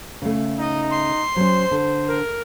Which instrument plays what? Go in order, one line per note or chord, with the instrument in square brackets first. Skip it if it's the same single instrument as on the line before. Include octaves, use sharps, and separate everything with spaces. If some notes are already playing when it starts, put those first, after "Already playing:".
[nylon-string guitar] C#3 A3
[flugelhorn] D#4 [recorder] D#5
[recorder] C6
[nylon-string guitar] F#3 C#4 [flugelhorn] C5
[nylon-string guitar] D3
[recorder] A#4